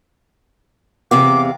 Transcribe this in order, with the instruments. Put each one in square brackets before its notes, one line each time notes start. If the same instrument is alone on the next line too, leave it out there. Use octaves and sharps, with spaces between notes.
[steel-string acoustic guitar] E2 C3 F5 [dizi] D6